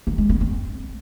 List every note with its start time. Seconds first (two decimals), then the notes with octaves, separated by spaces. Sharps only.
0.07 A#3
0.18 G#3
0.29 B3
0.41 C4